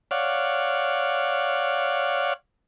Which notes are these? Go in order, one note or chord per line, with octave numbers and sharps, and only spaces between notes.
C#5 D5 F5 F#5